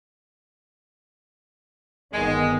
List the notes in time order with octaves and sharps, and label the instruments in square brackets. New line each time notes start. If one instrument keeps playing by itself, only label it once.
[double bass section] G1 D#3 B3 [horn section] G#3